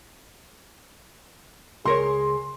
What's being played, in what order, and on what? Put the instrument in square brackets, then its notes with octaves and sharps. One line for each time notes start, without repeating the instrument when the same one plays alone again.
[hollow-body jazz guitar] C#2 A#4 C#5 [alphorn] G#4 [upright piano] C6